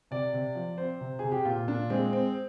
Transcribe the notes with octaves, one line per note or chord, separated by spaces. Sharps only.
C3 D5
C3
F3
C4 C5
C3
C3 G#4
G4
A#2 F4
A#2 D4
G#3 C4
C4